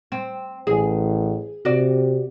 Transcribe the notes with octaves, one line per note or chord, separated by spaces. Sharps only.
C4
A1 G#4
C3 F#4 D5